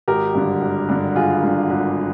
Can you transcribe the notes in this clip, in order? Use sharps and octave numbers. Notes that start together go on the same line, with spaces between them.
G#1 G4 A#4
G2 D3
G#1
G2 D3
G#1 F4 G#4
G2 D3
G#1